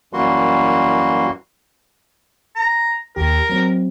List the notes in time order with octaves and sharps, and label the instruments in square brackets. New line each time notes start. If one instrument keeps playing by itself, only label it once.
[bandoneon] F#2 E3 G3 A#3 F#4 C6
[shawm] A#5
[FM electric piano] D#2 G4 [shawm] A#4
[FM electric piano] F#3 C4